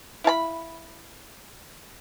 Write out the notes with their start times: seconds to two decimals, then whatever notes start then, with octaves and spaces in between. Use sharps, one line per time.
0.24 E4 F5 A5 B5